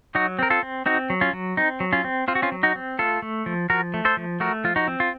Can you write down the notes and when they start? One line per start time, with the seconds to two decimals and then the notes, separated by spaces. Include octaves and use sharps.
0.15 F#3 D#4 F#4
0.39 C4 A#4
0.50 F4 A4
0.63 C4
0.86 C4 D#4 F#4
1.10 F#3
1.21 C#4 F4
1.33 F#3
1.57 C4 D#4
1.80 F#3
1.93 C#4 F4
2.04 C4
2.28 C4 F4
2.35 F#4
2.42 C#4 F4
2.52 F#3
2.63 D#4 F#4
2.75 C4
2.99 A3 F4 A4
3.22 A3
3.46 F3
3.70 F3 F#4 A#4
3.94 A3
4.05 A4 C5
4.17 F3
4.40 A3 F#4 A#4
4.64 F3 F4
4.76 D#4 F#4
4.88 C4
5.00 F4